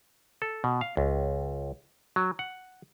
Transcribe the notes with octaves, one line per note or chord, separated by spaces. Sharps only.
A4
B2
F5
C#2
F#3
F#5